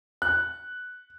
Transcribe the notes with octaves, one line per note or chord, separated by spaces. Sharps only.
F#6